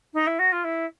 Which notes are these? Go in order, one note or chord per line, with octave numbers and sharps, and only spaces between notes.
D#4
E4
F#4
F4
E4